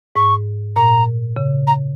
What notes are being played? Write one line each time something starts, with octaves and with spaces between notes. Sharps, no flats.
G#2 C#6
A#2 A#5
C#3
A#5